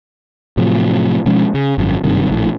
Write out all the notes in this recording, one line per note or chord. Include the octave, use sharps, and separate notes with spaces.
A2 C3 F3 F#3
B2 F3 G#3 C#4
C#3
G#1 F#2
F#1 G2 C3 D#3
A#1 A2